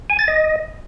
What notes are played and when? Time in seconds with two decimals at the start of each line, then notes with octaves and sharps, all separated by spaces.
0.10 G#5
0.19 A6
0.28 D#5